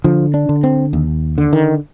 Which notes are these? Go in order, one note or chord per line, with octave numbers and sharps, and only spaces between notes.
D3 F3
D4
D3
C4
D#2
D3
D#3